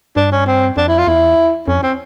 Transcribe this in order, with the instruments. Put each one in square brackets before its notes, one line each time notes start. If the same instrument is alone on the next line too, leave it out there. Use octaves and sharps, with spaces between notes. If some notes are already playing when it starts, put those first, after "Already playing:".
[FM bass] G2 [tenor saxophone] D4
[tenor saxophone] C#4
C4
[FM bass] F2 [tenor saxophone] D4
[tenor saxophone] E4
F4
[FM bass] E2 [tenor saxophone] E4
[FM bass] F2 [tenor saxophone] C#4
[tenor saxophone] C4